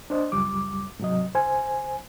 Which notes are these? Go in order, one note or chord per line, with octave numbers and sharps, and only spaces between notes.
D4 C5 D#5
C#2 F#2 G3 D6
G#2 C3 F#3 D#5
C#2 C5 G#5